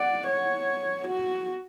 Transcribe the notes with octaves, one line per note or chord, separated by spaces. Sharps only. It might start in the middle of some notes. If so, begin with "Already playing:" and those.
Already playing: D5 F#5
C#5
F#4